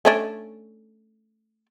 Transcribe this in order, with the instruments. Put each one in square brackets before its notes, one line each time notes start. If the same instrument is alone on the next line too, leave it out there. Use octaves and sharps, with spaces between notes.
[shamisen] A3 C#4 D4